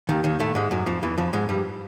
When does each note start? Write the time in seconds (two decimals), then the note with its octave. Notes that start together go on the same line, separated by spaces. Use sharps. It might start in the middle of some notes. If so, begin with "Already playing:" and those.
0.09 D#2 D#3
0.24 D#2 D#3
0.40 A2 A3
0.55 G#2 G#3
0.71 F#2 F#3
0.86 F2 F3
1.03 E2 E3
1.18 F2 F3
1.33 G#2 G#3
1.49 G2 G3